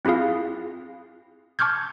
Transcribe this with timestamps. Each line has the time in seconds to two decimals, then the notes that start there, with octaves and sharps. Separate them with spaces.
0.05 C4 E4 F4 G#4 F5
1.59 A5 C#6 D6 F6 G6 G#6